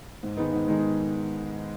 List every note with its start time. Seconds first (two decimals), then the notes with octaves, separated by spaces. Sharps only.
0.23 G#2
0.37 D#3 G#3 B3 D#4
0.52 G#2
0.67 D#3 G#3 B3 D#4